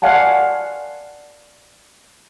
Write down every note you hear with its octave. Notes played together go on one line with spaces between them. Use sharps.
D5 F5 F#5 G#5 A5